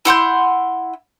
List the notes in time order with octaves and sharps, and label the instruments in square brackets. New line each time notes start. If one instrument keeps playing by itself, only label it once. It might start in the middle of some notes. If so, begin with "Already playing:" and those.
[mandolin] E4 F#5 C6 G6